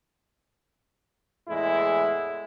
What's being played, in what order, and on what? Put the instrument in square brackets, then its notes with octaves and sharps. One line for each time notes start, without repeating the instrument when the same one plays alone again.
[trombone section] E2 A2 G#3 E4